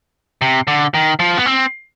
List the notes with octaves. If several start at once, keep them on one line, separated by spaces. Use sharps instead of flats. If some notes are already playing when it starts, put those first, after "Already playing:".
C3
D3
D#3
F3
B3
C4